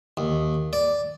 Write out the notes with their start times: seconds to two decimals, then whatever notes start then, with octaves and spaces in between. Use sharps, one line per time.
0.17 D#2
0.73 D5